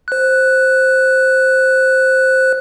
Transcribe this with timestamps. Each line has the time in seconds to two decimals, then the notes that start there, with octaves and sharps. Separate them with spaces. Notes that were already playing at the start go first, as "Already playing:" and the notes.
0.08 C5 F#6